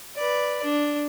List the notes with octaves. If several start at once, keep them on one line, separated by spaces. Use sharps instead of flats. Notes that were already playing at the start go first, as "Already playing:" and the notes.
B4 D5
D4